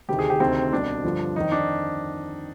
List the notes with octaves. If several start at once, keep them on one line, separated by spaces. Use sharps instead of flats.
D2 C3 D#3 G4
G#4
G4
D2 C3 D#3 C4
C2 B2 D4
G2 D3 F3
F2 D#3 D#4
D4